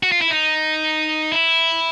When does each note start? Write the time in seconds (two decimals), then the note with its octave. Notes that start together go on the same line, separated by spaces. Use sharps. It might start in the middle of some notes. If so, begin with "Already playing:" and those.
0.03 F#4
0.12 F4
0.21 E4
0.31 D#4
1.32 E4